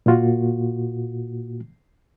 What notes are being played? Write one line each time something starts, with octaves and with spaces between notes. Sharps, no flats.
A#2 A#3 F4 F#4